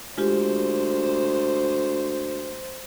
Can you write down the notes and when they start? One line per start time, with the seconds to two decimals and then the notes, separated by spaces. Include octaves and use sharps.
0.18 D2 G#3 F4 G4 C5